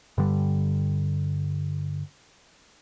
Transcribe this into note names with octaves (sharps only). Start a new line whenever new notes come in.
G2 D3 G3